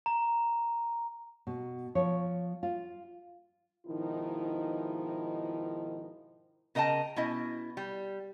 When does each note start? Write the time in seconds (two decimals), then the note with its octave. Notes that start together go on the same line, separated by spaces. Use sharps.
0.06 A#5
1.47 B2
1.95 F3 C#5
2.63 F4
3.86 G#2 B2 D#3 F3 D#4 E4
6.75 C#3 A#4 D#5 G5 A5
7.16 B2 C#4 E4 D#5
7.77 G3